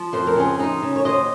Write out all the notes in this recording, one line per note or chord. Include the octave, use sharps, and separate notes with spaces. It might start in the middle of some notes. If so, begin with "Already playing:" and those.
Already playing: F3
F2 C5
A#4
C#3 G#4 C5
D#4
C#3
C#5
D#2 C5 D#5